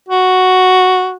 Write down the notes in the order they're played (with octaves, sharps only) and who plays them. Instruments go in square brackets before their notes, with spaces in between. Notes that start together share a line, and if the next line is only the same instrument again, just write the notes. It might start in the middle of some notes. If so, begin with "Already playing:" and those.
[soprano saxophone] F#4